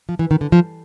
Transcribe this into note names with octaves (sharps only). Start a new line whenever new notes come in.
F3
E3
D#3
D3
F3